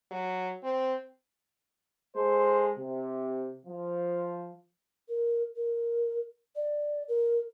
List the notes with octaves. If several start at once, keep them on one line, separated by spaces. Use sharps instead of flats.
F#3
C4
G#3 A4 C5
C3
F3
A#4
A#4
D5
A#4